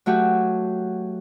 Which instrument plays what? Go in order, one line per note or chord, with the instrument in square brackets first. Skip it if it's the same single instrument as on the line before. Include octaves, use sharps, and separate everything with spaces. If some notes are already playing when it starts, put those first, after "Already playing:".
[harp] F#3 A3 F#4 G4